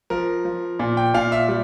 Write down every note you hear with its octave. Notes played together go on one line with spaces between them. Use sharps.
F3 A#4
F3
A#2
G5
A#2 F5
E5
G3